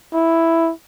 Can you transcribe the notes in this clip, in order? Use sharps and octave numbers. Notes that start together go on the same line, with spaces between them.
E4